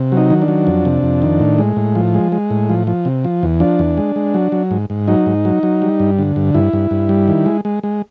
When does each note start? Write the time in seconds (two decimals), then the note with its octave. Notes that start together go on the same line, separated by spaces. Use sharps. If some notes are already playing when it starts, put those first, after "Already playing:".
Already playing: C3
0.12 F#3
0.17 D#4
0.30 D#3
0.42 D4
0.48 F#3
0.67 F2
0.85 C3
1.03 F2
1.22 D#3
1.40 A2
1.58 G#3
1.76 A2
1.95 F3
2.14 G#3
2.32 G#3
2.50 A2
2.69 F3
2.87 F3
3.05 C3
3.24 F3
3.43 E2
3.60 F3 D4
3.79 E2
3.97 G#3
4.16 G#3
4.34 F#3
4.52 F#3
4.71 G#2
4.90 G#2
5.08 F#3 D#4
5.26 G#2
5.45 F#3
5.63 F#3
5.82 G3
6.00 G2
6.19 D3
6.36 G2
6.54 G2 E4
6.73 G2
6.91 G2
7.09 G3
7.28 D#3
7.46 G#3
7.65 G#3
7.83 G#3